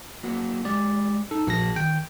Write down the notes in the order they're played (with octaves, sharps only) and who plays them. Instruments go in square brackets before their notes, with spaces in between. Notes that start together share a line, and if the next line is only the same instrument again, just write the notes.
[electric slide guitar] F#3 A#3 F#4
[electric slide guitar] G#3 G4 [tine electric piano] D5
[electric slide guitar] D#4 [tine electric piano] A4
[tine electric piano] A#1 A#6 [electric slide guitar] F#4 G#4 A5
[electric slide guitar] D#3 [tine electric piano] G5